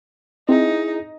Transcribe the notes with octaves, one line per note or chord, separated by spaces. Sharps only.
C4 D#4 E4 G#4